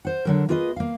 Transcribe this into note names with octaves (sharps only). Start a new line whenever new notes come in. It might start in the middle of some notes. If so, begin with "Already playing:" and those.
C5 F#5
D3 F#3 A#4
A#3 F4 G#4 B4 D5 D#5
A#3 F5